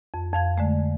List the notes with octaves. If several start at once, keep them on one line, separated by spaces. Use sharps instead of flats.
F2
F2 F5 G#6
D3 G#3 A3